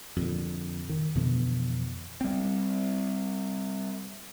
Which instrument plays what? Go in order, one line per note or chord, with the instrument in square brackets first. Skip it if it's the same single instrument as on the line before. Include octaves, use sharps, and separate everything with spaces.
[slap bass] F2 A#2 D3
D#3
F2 B2 D3 E3
[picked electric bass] G3 C4